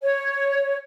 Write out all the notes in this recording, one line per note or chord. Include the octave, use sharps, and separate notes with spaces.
C#5